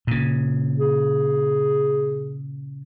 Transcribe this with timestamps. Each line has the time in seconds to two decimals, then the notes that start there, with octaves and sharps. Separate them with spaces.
0.07 A#2 C#3
0.80 G#4